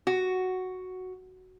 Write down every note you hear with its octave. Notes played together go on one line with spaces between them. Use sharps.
F#4